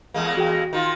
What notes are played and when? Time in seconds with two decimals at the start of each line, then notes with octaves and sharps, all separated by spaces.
0.14 E2 G#3 A#3
0.37 F#4 G#4 G5
0.73 D#3 F4